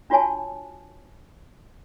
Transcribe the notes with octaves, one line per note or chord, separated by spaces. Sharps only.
D4 F4 F#4 C#5 G#5 A5